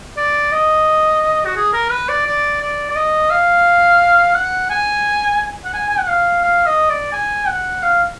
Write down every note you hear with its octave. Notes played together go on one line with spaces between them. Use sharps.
D5
D#5
F#4
G#4
A#4
B4
D5
D5
D5
D5
D#5
F5
F#5
G#5
F#5
G#5
G#5
F#5
F5
F5
D#5
D5
G#5
F#5
F5